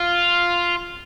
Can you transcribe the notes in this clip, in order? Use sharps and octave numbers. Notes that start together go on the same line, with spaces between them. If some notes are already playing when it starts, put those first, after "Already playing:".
Already playing: F4